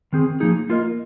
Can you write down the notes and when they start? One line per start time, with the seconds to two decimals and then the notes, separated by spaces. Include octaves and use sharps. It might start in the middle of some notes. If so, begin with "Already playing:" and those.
0.13 D#3 C4 G#4
0.40 F3 A#3 D#4 G#4
0.69 A#3 F4 A#4 D#5